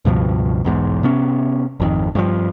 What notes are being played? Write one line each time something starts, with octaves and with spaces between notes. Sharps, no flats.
C#2 G2 B2 F3
B1 E2 G#2
C3 B3 C#4
G#1 F2 D#3
G2 E3 F3